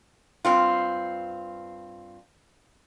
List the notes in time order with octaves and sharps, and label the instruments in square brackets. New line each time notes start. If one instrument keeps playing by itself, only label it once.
[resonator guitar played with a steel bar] G2 C4 F4